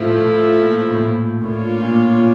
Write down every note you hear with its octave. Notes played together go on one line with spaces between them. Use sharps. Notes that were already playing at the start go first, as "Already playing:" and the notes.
Already playing: A2 F3 A3 E4
A2
A#2
A2
A#2
A2 A#3 D4 F4 C#5
A#2
A#2